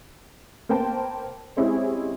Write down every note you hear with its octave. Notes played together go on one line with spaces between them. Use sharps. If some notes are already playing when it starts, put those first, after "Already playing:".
A#3 B3 B4 C5 G5 A5
G#3 C4 C#4 E4 G4 G#4